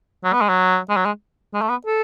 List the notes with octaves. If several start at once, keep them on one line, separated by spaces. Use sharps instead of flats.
F#3
B3
G#3
F#3
G#3
F#3
G#3
G#3
A3
B3
A4